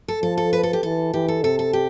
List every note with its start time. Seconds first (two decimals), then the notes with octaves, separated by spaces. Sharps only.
0.08 A4
0.23 F3 A4
0.38 A4
0.53 B4
0.63 A4
0.73 G4
0.83 E3 A4
1.14 E3 G4
1.28 A4
1.43 C3 A4
1.59 A4
1.73 G4